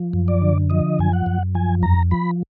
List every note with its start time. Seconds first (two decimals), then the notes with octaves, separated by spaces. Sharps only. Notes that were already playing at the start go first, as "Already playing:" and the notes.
Already playing: F3
0.13 F#2
0.28 D5
0.42 D3
0.70 F3 D#5
0.99 F#2 G#5
1.13 F#5
1.26 F#2
1.55 F3 G#5
1.83 F2 A#5
2.11 F3 B5